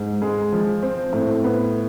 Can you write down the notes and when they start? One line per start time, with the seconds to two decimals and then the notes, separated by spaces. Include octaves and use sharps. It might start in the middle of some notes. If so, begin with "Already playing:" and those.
Already playing: G#2
0.22 G#3
0.52 F3
0.82 C4
1.13 A2
1.44 B3